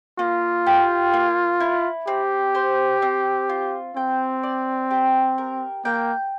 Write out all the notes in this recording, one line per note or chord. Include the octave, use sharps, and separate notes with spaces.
A#3 F4
G4
A#3
E4
C4 G4
C5
C4
F4
C4 G5
D5
G4
A#4
A#3 G5